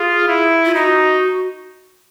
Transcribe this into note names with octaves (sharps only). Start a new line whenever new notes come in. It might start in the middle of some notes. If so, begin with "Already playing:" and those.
Already playing: F4 G#4
E4
F4
D#4 F#4